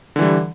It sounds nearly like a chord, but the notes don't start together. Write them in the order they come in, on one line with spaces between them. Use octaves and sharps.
D3 E3 G3